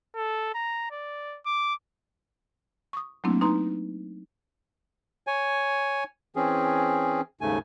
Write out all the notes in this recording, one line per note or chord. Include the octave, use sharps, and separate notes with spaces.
A4
A#5
D5
D6
C#6 D#6
F#3 A3 A#3 C4 D4 E4
D#4 B4 A#5 C6
C#5 G#5
E3 C4 C#4 G#4
D#2 G#2 C#3 A3 G#5